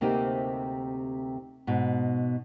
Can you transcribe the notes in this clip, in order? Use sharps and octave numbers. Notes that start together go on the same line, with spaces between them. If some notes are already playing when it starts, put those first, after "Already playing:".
D2 C3 A#3 C4 D#4 G4
G#2 B2